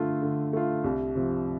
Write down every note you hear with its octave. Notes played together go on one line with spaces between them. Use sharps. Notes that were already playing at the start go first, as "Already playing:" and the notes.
Already playing: D3 A3 F4
D3
A3 F4
C2
C3 F3